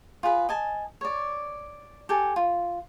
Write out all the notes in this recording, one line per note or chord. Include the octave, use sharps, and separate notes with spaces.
F4 G#4 B4 B5
D#5 G#5 A5
C#5 D5
G4 A4 G#5
F4